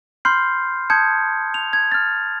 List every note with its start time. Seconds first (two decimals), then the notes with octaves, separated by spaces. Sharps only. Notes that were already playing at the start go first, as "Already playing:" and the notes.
0.25 B5 C6 F6 G6 C7
0.90 A5 D#6 G6 G#6 C#7
1.54 F7
1.73 G#6
1.92 F6 A6